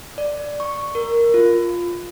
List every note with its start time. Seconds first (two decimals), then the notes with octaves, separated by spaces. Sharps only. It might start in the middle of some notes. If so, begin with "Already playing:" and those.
0.18 D5
0.60 C#6
0.95 A#4
1.34 F4